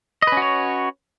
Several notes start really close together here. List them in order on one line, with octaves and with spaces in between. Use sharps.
D#5 B4 C#4 F#4 C#5